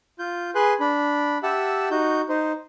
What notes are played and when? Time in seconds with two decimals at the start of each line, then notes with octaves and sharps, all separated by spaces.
0.19 F4 G6
0.55 G#4 B4 G#5 C6 F#6
0.80 D4 B5
1.43 G4 E5 F#5 A5 E6
1.91 D#4 F#4 G6
2.29 D#4 C5